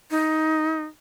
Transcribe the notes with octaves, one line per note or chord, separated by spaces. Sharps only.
D#4